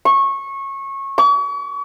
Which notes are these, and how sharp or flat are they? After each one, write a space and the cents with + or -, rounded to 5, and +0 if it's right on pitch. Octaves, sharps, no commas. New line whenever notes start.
C#6 -20
C#6 +40